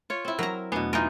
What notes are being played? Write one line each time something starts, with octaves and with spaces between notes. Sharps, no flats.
F4 C#5
C4 E4
F#3 A#4 A#5
E2 B2 A3 B3 D4
E3 D#4 F4 A#4